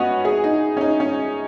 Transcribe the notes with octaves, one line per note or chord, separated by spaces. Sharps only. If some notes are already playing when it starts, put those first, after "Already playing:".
Already playing: B3 C#4 D#4 F#4
G#4
D#4
C#4
D#4
C#4